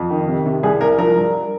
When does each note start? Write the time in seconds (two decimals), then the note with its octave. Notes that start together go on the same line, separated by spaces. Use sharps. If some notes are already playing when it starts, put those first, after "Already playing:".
Already playing: F2
0.11 D#3
0.28 C3
0.46 C3
0.63 C2 G#4
0.81 C2 A#4
0.98 F3 A#4
1.16 G2